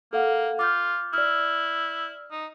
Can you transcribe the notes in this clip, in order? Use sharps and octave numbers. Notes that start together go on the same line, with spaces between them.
A#3 A4 F5 F#5
F4 D6 F6 G6
E4 D5 F6
D#4